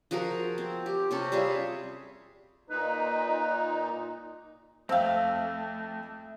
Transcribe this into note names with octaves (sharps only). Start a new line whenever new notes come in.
F3 F#4 G#4 A#4
C4
G4
C3 C#4 A4
G3 F4 G#4 E5
A#2 D#4 B4
F2 A3 C4 E5 F5 E6